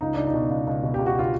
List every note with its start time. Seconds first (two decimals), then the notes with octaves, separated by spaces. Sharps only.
0.01 C#2 D#4
0.14 C#2 D4
0.27 D#4
0.34 B2
0.50 C#2
0.67 C#2
0.83 B2
0.94 C#2 G4
1.06 F#4
1.19 F4